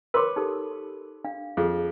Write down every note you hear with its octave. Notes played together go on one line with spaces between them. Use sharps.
A#4 B4 C#5 C6 D6
D#4 G4 A4
D4 F5
F2 G#4